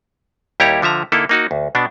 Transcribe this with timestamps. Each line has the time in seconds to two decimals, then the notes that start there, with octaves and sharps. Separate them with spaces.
0.60 D#2 G3 E4 G4 C#5 A#5
0.82 D3 F3 E5 A#5
1.12 D3 A#3 D#4 E4 A4
1.29 A#3 D#4 F#4
1.51 D2
1.75 B2 B3 D4